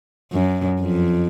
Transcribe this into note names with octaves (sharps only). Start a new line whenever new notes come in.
F#2
F2